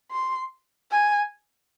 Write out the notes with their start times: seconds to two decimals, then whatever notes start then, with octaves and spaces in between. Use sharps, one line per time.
0.11 C6
0.91 G#5